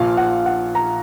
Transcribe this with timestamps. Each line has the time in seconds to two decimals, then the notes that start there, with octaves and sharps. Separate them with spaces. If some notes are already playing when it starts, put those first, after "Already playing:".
Already playing: A#1 A#2 F3 F5
0.17 F#5
0.46 F#5
0.75 A#5